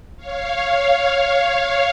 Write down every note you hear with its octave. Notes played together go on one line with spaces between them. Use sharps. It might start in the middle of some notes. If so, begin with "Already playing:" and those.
C#5 F5
C#5 F5